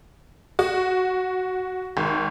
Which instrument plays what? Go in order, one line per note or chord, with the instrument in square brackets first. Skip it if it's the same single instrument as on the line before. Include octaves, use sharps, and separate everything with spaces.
[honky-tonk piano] F#4
G#1